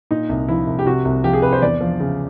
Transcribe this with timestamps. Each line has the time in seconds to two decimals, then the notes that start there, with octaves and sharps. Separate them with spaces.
0.11 A#2 D#4
0.29 C2
0.48 F3 E4
0.67 C2
0.79 G4
0.86 C3 F#4
1.05 C2
1.24 F3 G4
1.33 G#4
1.42 C2 B4
1.53 C5
1.62 E2 D5
1.81 F3
2.00 C#3